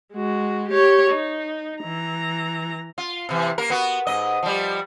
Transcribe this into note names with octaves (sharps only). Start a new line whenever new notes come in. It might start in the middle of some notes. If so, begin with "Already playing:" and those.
G#3 F#4
G4 C#5
D#4
E3 A#5
F4
C3 E3
A#3 A#4
B3 F#4
G#2 D#5
F3 G3